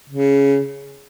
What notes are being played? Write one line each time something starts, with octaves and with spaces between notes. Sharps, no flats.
C#3